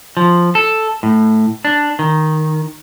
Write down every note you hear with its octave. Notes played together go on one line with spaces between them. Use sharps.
F3
A4
A2
D4
D#3